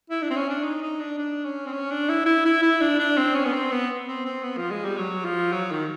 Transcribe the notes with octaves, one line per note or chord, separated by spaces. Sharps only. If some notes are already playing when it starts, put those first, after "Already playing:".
E4
D4
C4
C#4
D4
D#4
D#4
D4
D4
C#4
C4
C#4
D4
E4
E4
E4
E4
D4
D4
C4
C#4
B3
C4
B3
C4
C4
B3
F3
G#3
G3
F#3
F3
F#3
D#3